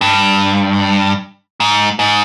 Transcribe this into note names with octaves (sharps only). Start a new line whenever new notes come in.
G2
G#2
G#2